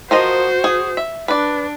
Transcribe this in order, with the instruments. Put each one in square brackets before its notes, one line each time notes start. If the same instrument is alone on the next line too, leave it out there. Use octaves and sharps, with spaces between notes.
[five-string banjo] F3 A#4 D#5 [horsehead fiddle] F#4 C5
[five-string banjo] G#4
E5
[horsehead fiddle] D4 [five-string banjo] B4 D5